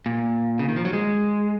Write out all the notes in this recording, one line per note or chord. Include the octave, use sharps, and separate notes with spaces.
A#2
C#3
D#3
F3
F#3
G#3